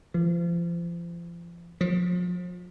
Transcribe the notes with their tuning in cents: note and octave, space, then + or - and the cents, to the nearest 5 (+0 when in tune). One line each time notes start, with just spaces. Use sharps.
F3 -35
F3 +35